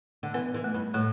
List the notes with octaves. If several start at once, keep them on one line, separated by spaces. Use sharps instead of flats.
D3
E3 B3
E3
A3
G2
A2 A3